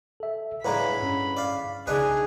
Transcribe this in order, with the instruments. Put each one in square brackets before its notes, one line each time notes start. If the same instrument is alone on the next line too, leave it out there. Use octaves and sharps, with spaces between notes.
[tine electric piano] A4 E5
[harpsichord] A2 D3 G#3 [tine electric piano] B4 F5 A#5 [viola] B5
[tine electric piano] G2 C#4
[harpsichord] D5 F5
[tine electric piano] B1 C#3 [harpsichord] D4 D#4 B4 [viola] G#4